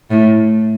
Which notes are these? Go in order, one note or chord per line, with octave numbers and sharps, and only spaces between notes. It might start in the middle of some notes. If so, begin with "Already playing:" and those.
A2